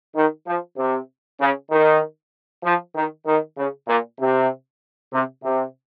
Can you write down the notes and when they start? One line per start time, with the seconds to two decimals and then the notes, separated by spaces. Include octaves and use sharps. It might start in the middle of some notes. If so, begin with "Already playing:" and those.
0.16 D#3
0.47 F3
0.77 C3
1.40 C#3
1.71 D#3
2.64 F3
2.94 D#3
3.27 D#3
3.57 C#3
3.88 A#2
4.20 C3
5.12 C3
5.44 C3